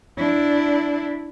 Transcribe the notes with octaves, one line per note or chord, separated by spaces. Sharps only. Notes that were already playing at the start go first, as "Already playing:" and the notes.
D4 E4